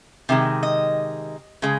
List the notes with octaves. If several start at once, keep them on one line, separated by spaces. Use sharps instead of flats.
C3 D#3 G#3
D#5
C#3 G#3